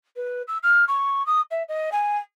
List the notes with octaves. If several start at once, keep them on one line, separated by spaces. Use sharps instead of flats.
B4
E6
F6
C#6
D#6
E5
D#5
G#5